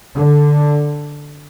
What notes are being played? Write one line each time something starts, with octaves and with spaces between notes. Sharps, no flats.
D3